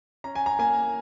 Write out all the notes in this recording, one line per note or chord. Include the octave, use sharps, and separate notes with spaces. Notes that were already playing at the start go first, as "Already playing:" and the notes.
C#4 A#5
G#5
A#5
A#3 G#5